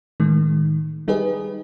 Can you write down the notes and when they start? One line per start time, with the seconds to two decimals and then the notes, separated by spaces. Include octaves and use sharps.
0.20 A2 D#3 G#3
1.08 G3 D#4 G4 G#4 B4 D#5